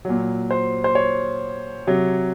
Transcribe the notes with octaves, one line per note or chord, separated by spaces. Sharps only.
A#2 F#3
C5
C5
C#5
C3 F#3